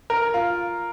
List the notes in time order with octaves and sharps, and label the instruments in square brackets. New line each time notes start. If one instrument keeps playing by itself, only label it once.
[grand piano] A#4
F4